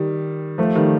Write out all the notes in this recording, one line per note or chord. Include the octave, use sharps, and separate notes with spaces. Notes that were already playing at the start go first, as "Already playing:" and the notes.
Already playing: D#3 G3
F3 A3
D#3 G3